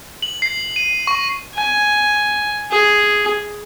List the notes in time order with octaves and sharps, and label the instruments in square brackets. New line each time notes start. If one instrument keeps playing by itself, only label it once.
[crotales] F#7
C7
D#7
C#6
[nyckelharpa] G#5
G#4